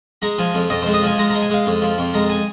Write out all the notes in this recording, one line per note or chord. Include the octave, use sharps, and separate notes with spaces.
G#3 A#5
F3 G#5
F2
F2 D#5
G#3 C5
D#5
F3 G#5
G#3 A#5
G#3 A#5
G#5
G#3 F5
F2
F3
F2
G#3 A#5
G#5